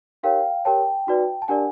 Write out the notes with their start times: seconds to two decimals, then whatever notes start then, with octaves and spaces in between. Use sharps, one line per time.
0.23 D#4 G4 A#4 C#5 F5 G5
0.65 G4 A#4 C#5 G5 A5
1.07 D#4 F#4 B4 D5
1.42 A5
1.48 D4 G4 A#4 D5 F#5 G#5